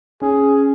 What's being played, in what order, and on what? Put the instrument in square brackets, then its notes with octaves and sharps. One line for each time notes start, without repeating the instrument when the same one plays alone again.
[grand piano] C#4 [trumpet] G#4